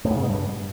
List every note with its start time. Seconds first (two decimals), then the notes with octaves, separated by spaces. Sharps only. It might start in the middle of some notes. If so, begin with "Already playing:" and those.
0.05 A2
0.11 G#2
0.16 C#3
0.22 B2
0.28 G2